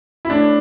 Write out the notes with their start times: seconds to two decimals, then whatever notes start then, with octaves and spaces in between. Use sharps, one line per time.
0.25 E4
0.29 A2 D4